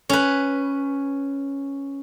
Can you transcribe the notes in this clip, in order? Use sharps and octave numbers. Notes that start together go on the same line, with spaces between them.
C#4 B4